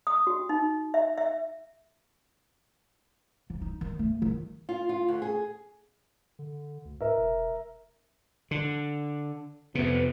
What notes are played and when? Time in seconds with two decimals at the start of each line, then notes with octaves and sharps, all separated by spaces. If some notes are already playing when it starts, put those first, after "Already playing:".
0.07 D#6
0.27 F#4
0.49 D#4
0.94 E5
1.18 E5
3.50 E3
3.62 D#4
3.81 D#3
3.99 A3
4.22 D#3
4.69 F4
4.89 F4
5.08 D2
5.22 G#4
6.39 D3
6.85 D2
7.01 A2 A#4 E5
7.17 E1
8.51 D3
9.75 F2 C3 B3